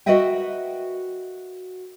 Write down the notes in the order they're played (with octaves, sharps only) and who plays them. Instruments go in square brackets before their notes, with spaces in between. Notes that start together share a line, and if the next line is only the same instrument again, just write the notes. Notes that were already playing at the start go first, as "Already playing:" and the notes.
[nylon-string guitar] F#4 A#4 B4 D#5 E5 G5